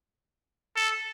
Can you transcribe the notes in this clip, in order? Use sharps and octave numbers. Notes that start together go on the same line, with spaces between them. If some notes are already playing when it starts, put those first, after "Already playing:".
A4